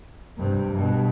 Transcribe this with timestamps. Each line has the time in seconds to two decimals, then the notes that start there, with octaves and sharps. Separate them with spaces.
0.37 G2 C3
0.73 G2 B2